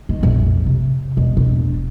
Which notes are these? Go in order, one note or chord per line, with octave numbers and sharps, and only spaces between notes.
D#3
A#1 F2
C3
E1
E1 D4